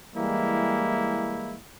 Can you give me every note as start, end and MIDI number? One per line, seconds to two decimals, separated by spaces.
0.16 1.56 52
0.16 1.56 55
0.16 1.56 56
0.16 1.56 58
0.16 1.56 64